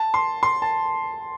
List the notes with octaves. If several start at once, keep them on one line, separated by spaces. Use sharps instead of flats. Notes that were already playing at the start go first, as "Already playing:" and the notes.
Already playing: A5
C6
C6
A5